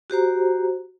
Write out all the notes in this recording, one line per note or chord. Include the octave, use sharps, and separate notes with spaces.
F#4 G4 C5 A#5